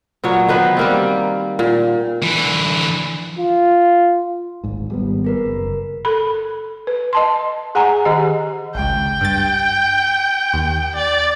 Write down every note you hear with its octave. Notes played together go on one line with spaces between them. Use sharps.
A#2 F#3 B3 C#5
D#3 B3 B4 C5
G3 A#3 C4
A#2
D3 E3
F4
D1 G#1 G#2
G#1 G3 B3
G#4 A#4 B4
F#1
A4 B5
B4
D#5 A5 C6
G#4 F#5 G#5 A#5
D#3 G4 G#4 D#5
G#1 C#2 G5
G2 A6
D#2
D5